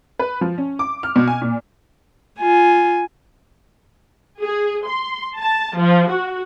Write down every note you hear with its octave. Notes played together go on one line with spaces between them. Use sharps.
B4
F3
C#4
D6
F6
B2
G#5
A#2
F4 G#5
G#4
C6
A5
F3
F#4